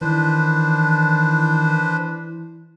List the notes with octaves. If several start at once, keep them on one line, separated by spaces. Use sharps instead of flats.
D#3 E3 D4 B4 C5